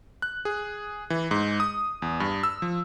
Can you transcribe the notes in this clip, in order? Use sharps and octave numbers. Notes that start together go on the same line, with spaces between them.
F#6
G#4
E3
G#2
D#6
E2
G2
E6
F3